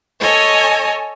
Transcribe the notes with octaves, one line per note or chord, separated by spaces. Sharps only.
A4 C#5 D#5 G#5